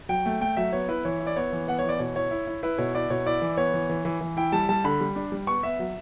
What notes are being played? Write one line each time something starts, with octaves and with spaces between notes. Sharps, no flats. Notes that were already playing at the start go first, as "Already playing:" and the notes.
F#3 G5
A3
A3 G5
F#3 E5
B3 C#5
E4 B4
E3 C#5
E4
D5
B3 C#5
E3
B3 F#5
C#5
E3 D5
B2 C#5
E4 C#5
E4
E4
E4 B4
B2 C#5
E4 D5
B2 C#5
E4 D5
E3
B3 C#5
E3
E3
E3
E3
E4 G5
G3 A5
G3 A5
D3 B5
G3
D4
G3
B3 C#6
B3 E5
F#3